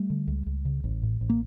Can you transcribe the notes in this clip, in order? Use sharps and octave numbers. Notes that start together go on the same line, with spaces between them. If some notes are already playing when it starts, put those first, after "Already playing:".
Already playing: G3 A3
D3
C#2
C#2
C#3
A1
A2
A1
A#3